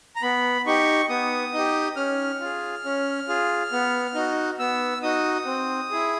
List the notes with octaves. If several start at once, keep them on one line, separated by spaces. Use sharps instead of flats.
A#5
B3 B5
D#4 G4 C#6
B3 D#6
D#4 G4
C#4 F6
F4 G#4
C#4
F4 G#4
B3
D#4 F#4
B3 E6
D#4 F#4 D#6
C4
E4 G#4